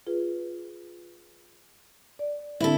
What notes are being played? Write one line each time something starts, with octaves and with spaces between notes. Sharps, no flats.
F4 G#4 B4
D5
D3 C4 D4 E4 A4